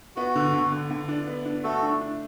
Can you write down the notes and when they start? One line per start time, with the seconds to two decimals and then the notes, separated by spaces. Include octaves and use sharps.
0.16 B3 F#4
0.35 D3
0.53 D3
0.72 D3
0.90 D3
1.08 D4
1.27 B3
1.45 D4
1.64 A3 F#4 A4
1.83 D4
2.01 D4